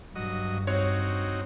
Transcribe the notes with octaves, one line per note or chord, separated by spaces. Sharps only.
G2 F#3 D#5
C4 D#4 F#4 C#5